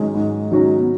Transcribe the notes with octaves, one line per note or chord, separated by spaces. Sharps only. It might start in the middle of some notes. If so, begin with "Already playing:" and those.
Already playing: G#2 D#3 F#3 G#3 C#4 F#4
G#2
D#3 F#3 C#4 F#4
B3